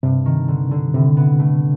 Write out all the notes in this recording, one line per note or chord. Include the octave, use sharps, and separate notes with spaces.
G2 C3
D#3
D3
D3
A2 C3
B3
A3